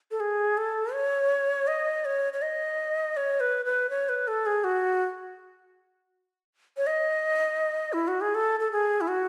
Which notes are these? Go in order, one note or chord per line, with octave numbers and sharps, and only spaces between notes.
A4
G#4
A4
C#5
D#5
C#5
C#5
D#5
C#5
B4
B4
C#5
B4
A4
G#4
F#4
C#5
D#5
E4
F#4
G#4
A4
A4
G#4
E4
F#4